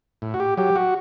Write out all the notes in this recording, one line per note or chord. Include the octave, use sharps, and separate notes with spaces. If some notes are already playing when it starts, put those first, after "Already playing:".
A2
F#4
G4
F#3 G4
F#4